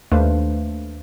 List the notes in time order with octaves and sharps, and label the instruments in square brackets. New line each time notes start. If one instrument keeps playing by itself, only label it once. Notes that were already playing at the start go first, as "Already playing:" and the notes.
[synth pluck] D#2 A3 D4 B4 C5 F5